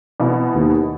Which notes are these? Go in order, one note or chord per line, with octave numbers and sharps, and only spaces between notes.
B2 E3 B3
D#2